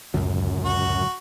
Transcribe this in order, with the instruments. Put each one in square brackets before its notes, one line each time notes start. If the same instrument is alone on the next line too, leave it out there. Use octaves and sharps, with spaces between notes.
[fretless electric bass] D1 C#2 [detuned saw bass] F#2
[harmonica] F#4